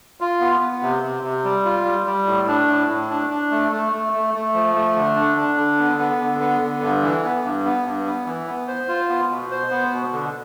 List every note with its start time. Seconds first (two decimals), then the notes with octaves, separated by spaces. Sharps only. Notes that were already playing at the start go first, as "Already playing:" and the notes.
0.21 F4
0.40 B3
0.61 B3
0.82 C3
1.03 C3
1.23 C3
1.44 G3
1.65 F4
1.85 G3
2.06 G3
2.26 A2
2.48 D4
2.68 A2
2.88 A2
3.10 D4
3.30 D4
3.51 A3
3.71 A3
3.92 A3
4.12 A3
4.34 A3
4.54 F3
4.74 A3
4.96 D3
5.16 D4
5.36 D4
5.57 D3
5.78 B3
5.98 B3
6.20 D3
6.40 B3
6.61 D3
6.81 G2
7.02 E3
7.23 B3
7.44 G2
7.65 B3
7.86 G2
8.05 B3
8.26 E3
8.47 B3
8.68 C5
8.88 F4
9.09 B3
9.30 B2
9.51 C5
9.71 B3
9.92 B2
10.12 D3